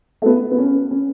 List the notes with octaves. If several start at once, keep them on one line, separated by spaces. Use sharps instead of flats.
A3
B3
B3
C#4
C#4